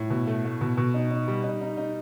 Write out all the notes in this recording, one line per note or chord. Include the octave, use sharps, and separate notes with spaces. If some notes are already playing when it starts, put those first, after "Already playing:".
Already playing: A2
B2
A3
A3
B2
B2
D#4
D#4
G3
D#4
D#4
D#4